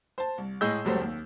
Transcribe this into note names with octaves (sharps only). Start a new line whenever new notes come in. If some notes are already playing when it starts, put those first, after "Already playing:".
C5 A5
C2
A2 G#3 G#4 D#5 E6 G6
F1 C#2 F#3 G3 A3 C5
D#2